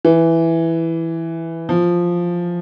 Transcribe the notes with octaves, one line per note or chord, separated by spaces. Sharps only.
E3
F3